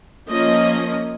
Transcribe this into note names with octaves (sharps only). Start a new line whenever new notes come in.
F3 A#3 C#4 D#5